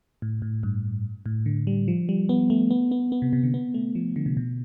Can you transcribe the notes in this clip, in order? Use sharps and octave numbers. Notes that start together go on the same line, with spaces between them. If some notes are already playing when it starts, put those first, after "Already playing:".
A2
A2
G2
A2
D3
G3
F3
G3
B3
A3
B3
B3
B3
C3
C3
D3
B3
A3
F3
D3
C3
B2